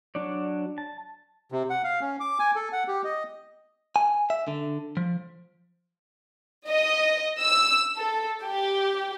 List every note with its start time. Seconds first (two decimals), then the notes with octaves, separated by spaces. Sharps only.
0.15 F#3 D4 C#5 D5
0.78 A5
1.52 C3
1.70 F#5
1.84 F5
2.01 C#4
2.20 D6
2.39 G#5
2.56 A4
2.73 F#5
2.88 G4
3.05 D#5
3.96 G#5
4.30 E5
4.48 D3
4.97 F3
6.68 D#5
7.40 E6
7.98 A4
8.45 G4